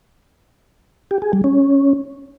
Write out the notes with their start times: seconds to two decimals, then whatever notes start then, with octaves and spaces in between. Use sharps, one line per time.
1.11 G4
1.22 G#4
1.33 G3
1.44 C#4